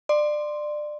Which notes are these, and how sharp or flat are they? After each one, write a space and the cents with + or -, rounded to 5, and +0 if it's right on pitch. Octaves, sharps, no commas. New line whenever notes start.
D5 +25 C6 +0